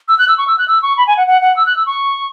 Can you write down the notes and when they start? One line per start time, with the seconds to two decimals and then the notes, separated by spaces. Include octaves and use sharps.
0.08 E6
0.19 F#6
0.28 E6
0.38 C#6
0.47 E6
0.58 F#6
0.68 E6
0.82 C#6
0.97 B5
1.07 G#5
1.17 F#5
1.27 F#5
1.42 F#5
1.57 E6
1.66 F#6
1.77 E6
1.86 C#6